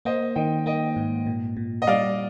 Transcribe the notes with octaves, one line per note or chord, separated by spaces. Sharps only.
A#3 C5 D#5
D#3 D#5 G5
A#3 D#5 G5
G#2
A#2
A#2
D#5
G3 D5 F5